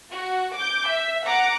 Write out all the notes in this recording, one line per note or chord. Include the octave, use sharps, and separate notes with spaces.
F#4
D6 G6
E5
F#5 A#5 D6